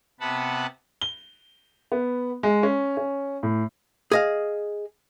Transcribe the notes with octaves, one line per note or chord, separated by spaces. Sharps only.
C3 B3 F#5 A5 B5
G7
B3
G#3
C#4
C#4
A2
G#4 D#5 F5